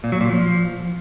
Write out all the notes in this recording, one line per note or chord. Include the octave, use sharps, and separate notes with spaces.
A#2
F#3
A#2
F3